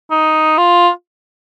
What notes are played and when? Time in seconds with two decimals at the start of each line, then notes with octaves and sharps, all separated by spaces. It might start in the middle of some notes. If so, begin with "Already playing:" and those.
0.11 D#4
0.58 F4